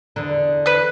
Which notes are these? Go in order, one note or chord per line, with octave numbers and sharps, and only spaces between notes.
E2 D3
B4 F#6